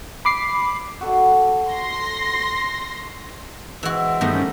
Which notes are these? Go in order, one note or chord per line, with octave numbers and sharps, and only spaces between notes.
B5 D6 C7
F#4 A4
C6 A#6
E3 G#3 C4 F#4 E5
G2 D#3 A3 B3 A#4
C#4